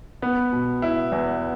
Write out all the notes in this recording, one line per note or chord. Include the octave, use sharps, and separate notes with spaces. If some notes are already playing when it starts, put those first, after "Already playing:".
B3
B2
E4
E2